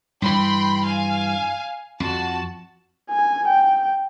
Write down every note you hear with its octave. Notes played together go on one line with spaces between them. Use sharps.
G2 E3 G5 B5 C6
F5 G#5
F2 F#4 A5
G#5
G5